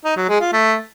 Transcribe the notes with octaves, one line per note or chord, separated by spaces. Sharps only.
D#4
F#3
G#3
F4
A3